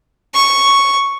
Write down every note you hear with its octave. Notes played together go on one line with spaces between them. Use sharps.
C#6